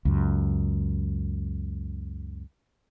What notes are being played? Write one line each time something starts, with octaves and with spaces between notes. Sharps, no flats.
C#2 F#2